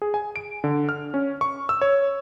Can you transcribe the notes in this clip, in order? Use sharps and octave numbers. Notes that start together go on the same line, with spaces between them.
G#4
G#5
D7
D3
F6
C#4
C#6
E6
C#5